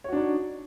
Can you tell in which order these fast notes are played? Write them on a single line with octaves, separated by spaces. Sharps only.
C#5 F#4 D4 D#4